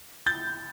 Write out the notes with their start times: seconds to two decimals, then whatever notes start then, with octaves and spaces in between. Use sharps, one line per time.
0.26 G6 A6